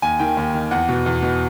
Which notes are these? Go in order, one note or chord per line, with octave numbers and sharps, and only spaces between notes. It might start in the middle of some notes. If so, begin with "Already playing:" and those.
D#2 G#5
D#3 G5
D#2
D#3
E2 F#5
B2
E2
B2